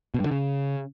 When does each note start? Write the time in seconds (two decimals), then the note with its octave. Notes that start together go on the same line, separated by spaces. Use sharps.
0.14 B2
0.20 G2
0.26 D3
0.31 C#3